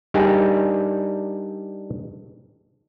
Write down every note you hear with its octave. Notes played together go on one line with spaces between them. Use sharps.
G3 D4 D#4 G4 G#4 A#4